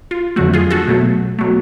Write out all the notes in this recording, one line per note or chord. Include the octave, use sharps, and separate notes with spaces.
F4
F2 D3 F#3 A3 F#4
F4 G#4
F#4 A4
B2 F#3 A3
B2 F#3 A3